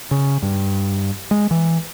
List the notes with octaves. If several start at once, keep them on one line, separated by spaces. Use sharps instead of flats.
C#3
G2
G#3
E3